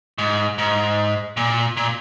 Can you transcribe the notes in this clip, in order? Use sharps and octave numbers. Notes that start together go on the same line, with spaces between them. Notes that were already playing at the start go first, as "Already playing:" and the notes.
G#2
G#2
A#2
A#2